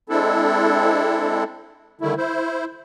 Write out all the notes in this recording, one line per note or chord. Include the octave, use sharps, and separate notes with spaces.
G#3 C4 D4 E4 A4
D3 D#3 G3 A3 E4
E4 C5